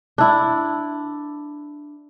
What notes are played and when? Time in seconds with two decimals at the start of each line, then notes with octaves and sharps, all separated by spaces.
0.18 D4 E4